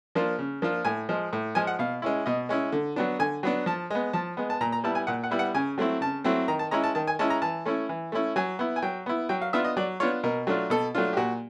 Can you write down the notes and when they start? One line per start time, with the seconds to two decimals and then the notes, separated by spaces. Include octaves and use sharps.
0.15 F3 A#3 D4 F4
0.39 C#3
0.62 F3 A#3 D4 F4
0.85 A2 G#5
1.09 F3 G#3
1.33 A2
1.55 F3 G#3 G#5
1.67 F#5
1.79 B2 F5
2.02 G#3 C#4 E4
2.26 B2 D#5
2.49 G#3 C#4 E4
2.72 D3
2.96 F#3 B3 D4
3.19 D3 G#5
3.43 F#3 B3 D4
3.66 F3 A5
3.90 G#3 B3
4.13 F3 A5
4.37 G#3 B3
4.50 A5
4.61 A#2 A#5
4.72 A#5
4.84 G3 B3 E4 A5
4.95 G#5
5.07 A#2 F#5
5.24 F#5
5.31 G3 B3 E4
5.39 F#5
5.54 C#3 G#5
5.78 F#3 A3 C4 E4
6.01 C#3 A5
6.24 F#3 A3 C4 E4
6.48 D#3 A#5
6.59 A5
6.71 G#3 C#4 E4 A#5
6.84 A5
6.95 D#3 A5
7.07 G#5
7.19 G#3 C#4 E4 A5
7.30 A#5
7.42 E3 A5
7.66 A3 C#4 E4
7.89 E3
8.12 A3 C#4 E4
8.36 F#3 G#5
8.59 B3 E4
8.76 G#5
8.82 F#3 G5
9.06 B3 E4
9.29 F#3 G5
9.42 F5
9.53 B3 D4 F4 E5
9.65 D#5
9.77 F#3 D5
10.00 B3 D4 F4 C#5
10.24 B2 A#4
10.47 F#3 A3 D4 F4
10.70 B2 A4
10.95 F#3 A3 D4 F4
11.13 G4
11.17 A#2 F#4